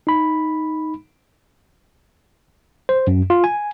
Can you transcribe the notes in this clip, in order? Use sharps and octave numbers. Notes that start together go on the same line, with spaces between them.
D#4 B5
C5
F#2
F4
G#5